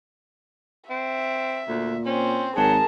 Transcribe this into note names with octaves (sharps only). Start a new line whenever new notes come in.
C4 E5
D2 A#2
C4 C#4 C5
G#1 F#3 G#4 A#4 A5